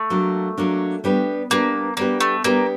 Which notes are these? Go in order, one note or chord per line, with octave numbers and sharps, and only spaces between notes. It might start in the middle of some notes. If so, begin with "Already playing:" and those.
Already playing: A3
F#3 A#3 D4
F#3 A#3 D4
G3 B3 D4 G4 B4
G3 A#3 B3 D4 G4 B4
G3 A#3 B3 D4 G4 B4
A3
G3 A#3 B3 D4 G4 B4